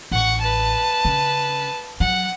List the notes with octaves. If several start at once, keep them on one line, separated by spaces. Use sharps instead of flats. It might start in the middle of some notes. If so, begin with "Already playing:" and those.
A1 F#5 C#6
B4 A5
C#3
F#3 F#5